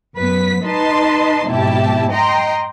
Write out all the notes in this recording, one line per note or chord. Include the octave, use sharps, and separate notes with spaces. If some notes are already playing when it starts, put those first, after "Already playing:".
F#2 B3 B4 B6
D#4 B4 D#5 A5 C6
F2 G#2 B2 E4 G4 A5
D#5 G5 A#5 C6